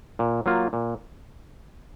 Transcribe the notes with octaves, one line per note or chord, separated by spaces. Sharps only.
A#2
F#3 A#3 F4
A#2